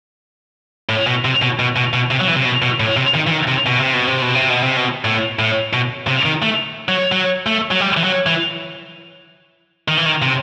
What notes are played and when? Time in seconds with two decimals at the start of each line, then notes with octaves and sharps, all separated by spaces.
0.89 A2
1.07 B2
1.25 C3
1.42 B2
1.59 B2
1.76 B2
1.93 B2
2.11 C3
2.21 F#3
2.28 E3
2.36 C3
2.45 B2
2.62 B2
2.80 A2
2.97 C3
3.15 D#3
3.27 E3
3.31 D#3
3.48 C3
3.66 B2
3.80 C3
3.94 B2
4.07 C3
4.22 B2
4.35 C3
4.50 B2
4.63 C3
4.76 B2
5.05 A2
5.39 A2
5.73 B2
6.08 C3
6.25 D#3
6.42 A3
6.88 F#3
7.12 F#3
7.46 A3
7.71 F#3
7.80 G3
7.97 E3
8.04 F#3
8.26 E3
9.88 D#3
9.97 E3
10.06 D#3
10.22 C3